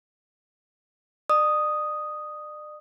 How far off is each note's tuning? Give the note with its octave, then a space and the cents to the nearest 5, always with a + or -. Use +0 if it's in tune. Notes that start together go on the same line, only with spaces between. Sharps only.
D5 +35 D#6 +0